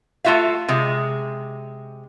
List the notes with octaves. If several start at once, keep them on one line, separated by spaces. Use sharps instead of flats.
A3 F4 F#4 E5 F5
C3 G#3